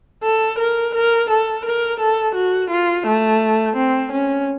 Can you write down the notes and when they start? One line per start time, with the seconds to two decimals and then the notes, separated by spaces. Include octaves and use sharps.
0.23 A4
0.59 A#4
0.95 A#4
1.30 A4
1.65 A#4
2.00 A4
2.35 F#4
2.70 F4
3.07 A3
3.76 C4
4.12 C#4